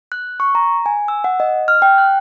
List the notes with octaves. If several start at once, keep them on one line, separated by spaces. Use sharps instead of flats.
F#6
C#6
A#5
G#5
E6
F#5
D#5
F6
G5
F#6